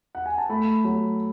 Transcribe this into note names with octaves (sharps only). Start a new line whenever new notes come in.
F#5
G#5
A5
A3 B5
F#3